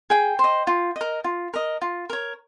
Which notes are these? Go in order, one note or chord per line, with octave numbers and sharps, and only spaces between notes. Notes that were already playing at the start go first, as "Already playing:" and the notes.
G#4 G5
C5 D#5
F4
D#5
A#4
F4
A#4 D#5
F4
A#4 C#5